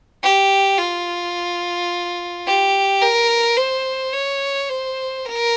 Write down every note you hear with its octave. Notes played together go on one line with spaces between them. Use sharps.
G4
F4
G4
A#4
C5
C#5
C5
A#4